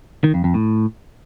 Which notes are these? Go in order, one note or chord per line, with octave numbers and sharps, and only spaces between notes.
D#3
F2
F2
A2